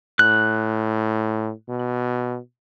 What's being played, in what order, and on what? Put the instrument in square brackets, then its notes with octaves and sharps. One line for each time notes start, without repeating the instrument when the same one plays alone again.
[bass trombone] A2 [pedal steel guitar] F#6
[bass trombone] B2